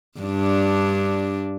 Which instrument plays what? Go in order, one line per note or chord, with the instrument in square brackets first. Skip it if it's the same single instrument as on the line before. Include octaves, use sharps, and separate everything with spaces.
[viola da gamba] G2 D4